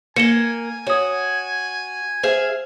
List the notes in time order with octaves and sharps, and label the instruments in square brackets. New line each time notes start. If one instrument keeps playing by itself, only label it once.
[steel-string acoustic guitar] A#3 [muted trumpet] G#5 [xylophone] C#7 E7 G7
[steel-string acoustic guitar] F#4 [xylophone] C#5 D#6
[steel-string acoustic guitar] G#4 E5 F5 [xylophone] C5